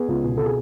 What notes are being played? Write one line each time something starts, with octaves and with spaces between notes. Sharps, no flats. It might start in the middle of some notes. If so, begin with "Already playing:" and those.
Already playing: B3 G#4
C#2
B2
B2 A4
G#4